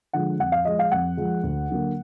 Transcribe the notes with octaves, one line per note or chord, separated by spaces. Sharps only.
D3 F3 G#3 F#5
F2 F#5
F5
F3 G#3 D#5
F5
F2 F#5
F3 G#3
D2
D3 F#3 A#3